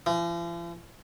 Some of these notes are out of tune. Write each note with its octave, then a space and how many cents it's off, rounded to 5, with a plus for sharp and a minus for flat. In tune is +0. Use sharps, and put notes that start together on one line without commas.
F3 -45